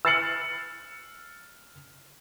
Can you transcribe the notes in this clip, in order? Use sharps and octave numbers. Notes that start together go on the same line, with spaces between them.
E6 F6 A6 C7 C#7 F#7